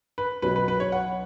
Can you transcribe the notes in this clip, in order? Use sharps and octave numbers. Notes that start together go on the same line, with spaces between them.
B4
B1 B2 F#3 C#4 B4
B4
B4
C#5
F#5